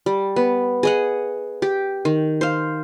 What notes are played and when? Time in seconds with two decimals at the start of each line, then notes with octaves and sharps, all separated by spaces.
0.06 G3
0.36 B3
0.83 G#4 D#5 F#5
1.62 G4
2.05 D#3
2.41 C5 F5